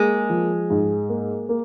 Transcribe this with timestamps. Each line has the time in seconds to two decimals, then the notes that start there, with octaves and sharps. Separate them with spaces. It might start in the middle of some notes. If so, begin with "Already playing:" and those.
Already playing: G#3 A#3
0.30 F3
0.70 G#2
1.09 A#3
1.49 A#3